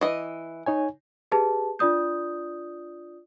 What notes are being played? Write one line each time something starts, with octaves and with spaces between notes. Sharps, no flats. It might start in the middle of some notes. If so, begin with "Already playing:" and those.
E3 D#5
D#4 C#5 G#5
G4 G#4 B4 A5
D4 F4 D5 D#6 G6